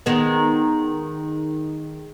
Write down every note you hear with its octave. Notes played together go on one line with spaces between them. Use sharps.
D#3 G#3 B3